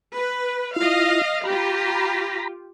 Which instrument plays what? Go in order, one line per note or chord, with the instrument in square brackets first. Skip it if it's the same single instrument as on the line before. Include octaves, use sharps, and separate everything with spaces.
[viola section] B4
[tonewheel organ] E4 F4 [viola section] D#5 F5
[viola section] F4 G4 [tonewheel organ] A#5 B5